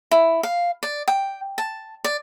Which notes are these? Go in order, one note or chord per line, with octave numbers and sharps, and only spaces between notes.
E4
F5
D5
G5
A5
D5